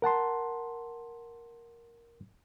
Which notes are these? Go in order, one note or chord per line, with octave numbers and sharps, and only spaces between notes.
A#4 F#5 A5 C6